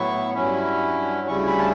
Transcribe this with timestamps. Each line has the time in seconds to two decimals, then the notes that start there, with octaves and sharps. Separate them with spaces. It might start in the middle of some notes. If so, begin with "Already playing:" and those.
Already playing: A2 F#3 B3 E4 C#6
0.34 G2 F#3 C#4 E4
1.27 D2 C#3 G3 C#4 E4 C#6
1.48 B5
1.59 A5